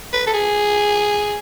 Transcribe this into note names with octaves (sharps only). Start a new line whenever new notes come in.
B4
A4
G#4